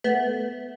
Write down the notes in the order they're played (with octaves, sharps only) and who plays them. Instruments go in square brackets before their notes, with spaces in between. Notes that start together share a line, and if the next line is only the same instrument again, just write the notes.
[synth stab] A3 B3